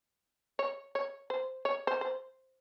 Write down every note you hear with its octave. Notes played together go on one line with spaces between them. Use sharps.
C#5
C#5
C5
C#5
C5
C5